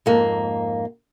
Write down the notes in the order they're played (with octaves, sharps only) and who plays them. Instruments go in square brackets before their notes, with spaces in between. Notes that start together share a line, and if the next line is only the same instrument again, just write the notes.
[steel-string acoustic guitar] F2 G#2 A#3